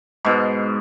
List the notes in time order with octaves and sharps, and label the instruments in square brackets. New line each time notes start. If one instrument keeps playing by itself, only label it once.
[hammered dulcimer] G#2 B2